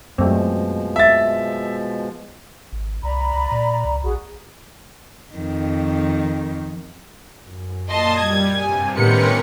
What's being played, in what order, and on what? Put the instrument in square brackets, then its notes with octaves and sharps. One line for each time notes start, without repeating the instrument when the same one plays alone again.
[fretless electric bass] F#2 [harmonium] B2 F3 G#3 [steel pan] A3 C4
[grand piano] E5 A6
[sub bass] G#1
[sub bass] C2 [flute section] D5 A#5 B5
[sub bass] C#2
A#2
C#2
[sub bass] A#1 [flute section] F#4 G#4
[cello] F2 D#3
[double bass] F#2
[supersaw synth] A#2 D#6 A6 [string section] D#5 A5 C6
[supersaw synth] G3 [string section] G#6
[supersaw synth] G2 C3 [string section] G#5
[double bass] A2 D#3 [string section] C3 B3 C#7 [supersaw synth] C#4 A#4 B4